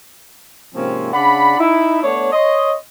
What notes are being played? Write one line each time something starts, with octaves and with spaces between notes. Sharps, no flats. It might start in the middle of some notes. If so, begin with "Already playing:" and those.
G#2 C3 F3 A#3 C4 C#4
C#3 D4 D5 F#5 B5
D#4 E4
A3 B3 D4 C#5
C#5 D#5 C6